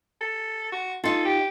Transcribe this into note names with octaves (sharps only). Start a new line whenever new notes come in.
A4
F#4
D#4 F4 A4
G4